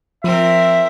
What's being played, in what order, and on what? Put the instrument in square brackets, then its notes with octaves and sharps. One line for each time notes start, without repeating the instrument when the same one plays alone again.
[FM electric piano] F3 [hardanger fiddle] C4 A#4 [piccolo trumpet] E5